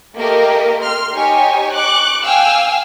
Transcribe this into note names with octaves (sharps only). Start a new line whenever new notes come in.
A3 A#3 G4 A#4 D#5
C6 F6
D#4 G4 C#5 G#5
C#6 D6 F#6
F5 G5 G#5 E6 F6